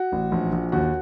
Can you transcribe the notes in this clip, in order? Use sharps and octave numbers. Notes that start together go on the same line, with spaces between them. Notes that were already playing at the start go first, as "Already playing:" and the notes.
Already playing: F#4
A1
A#1
A#1
D#2 F#4